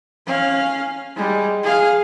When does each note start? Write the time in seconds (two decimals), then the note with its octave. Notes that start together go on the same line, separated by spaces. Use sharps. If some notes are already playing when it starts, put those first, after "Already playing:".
0.26 C#4 F5
1.16 G3 G#3
1.63 G#4 F5